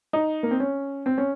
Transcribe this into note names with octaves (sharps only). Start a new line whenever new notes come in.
D#4
A#3
C4
C#4
C4
C#4